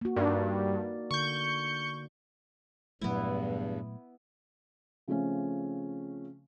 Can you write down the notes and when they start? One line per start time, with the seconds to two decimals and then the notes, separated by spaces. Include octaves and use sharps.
0.01 A#3 F#4
0.16 G2 D#4 A#4 D5
1.11 D3 C#6 G6
3.01 E2 G2 A#2 F#3 A3 B3 E4
5.08 C#3 F3 A3 C4 C#4